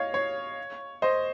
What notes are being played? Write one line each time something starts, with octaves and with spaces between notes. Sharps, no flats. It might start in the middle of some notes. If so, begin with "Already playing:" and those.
Already playing: C#5 D#5 F5
C#5
C5 D#5